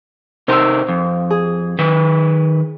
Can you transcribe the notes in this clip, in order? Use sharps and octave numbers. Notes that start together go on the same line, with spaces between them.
C3 D#4 A#4 C5 C6 E6
F2
G#4
D#3 B4